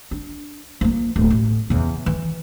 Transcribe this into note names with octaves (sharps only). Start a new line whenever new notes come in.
D4
F3 A#3
D1
A1
E2 C#3
E3